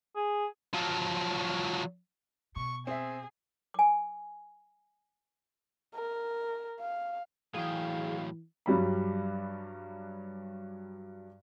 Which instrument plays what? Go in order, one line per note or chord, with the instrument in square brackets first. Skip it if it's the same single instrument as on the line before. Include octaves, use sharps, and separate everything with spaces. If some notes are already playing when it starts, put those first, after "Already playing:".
[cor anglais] G#4
[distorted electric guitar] F3 F#3
[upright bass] B2 [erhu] C#6
[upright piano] C4 E5 [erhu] G#4
[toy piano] G#5 D6
[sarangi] A#4
F5
[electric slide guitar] A2 F#3 G5 [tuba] E3 [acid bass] G#4 [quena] F5
[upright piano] G2 F#3 G3 B5